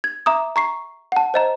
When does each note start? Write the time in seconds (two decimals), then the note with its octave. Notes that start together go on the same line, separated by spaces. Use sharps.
0.04 G#6
0.26 E5 A#5 D6 D#6
0.56 A#5 C#6 C7
1.12 F#5 A5
1.34 C5 D#5 A#5